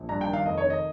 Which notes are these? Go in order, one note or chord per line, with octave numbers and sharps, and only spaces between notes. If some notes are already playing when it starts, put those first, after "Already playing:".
Already playing: A#1
G2 A#5
G5
D#3
F5
F1 D#5
C#5
D#3
D#5